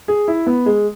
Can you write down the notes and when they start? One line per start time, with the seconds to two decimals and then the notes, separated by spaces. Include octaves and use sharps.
0.08 G#4
0.28 E4
0.47 B3
0.66 G#3